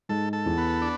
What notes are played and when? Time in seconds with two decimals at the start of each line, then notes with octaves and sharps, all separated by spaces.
0.09 G#2 A4
0.33 A4
0.46 E2
0.58 B3
0.82 D4